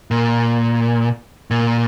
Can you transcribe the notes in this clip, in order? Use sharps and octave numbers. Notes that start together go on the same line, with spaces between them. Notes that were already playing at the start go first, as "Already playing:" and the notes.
A#2
A#2